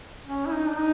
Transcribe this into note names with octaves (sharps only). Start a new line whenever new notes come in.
C#4
E4
D#4
D4
D#4